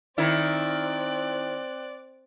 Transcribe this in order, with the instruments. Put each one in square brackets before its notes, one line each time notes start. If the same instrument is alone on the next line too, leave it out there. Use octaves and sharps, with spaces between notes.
[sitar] D#3 E4 [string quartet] C4 F#6 [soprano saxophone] D5